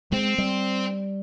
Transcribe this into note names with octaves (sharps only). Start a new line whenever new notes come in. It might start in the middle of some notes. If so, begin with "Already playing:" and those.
G#3 C4
G3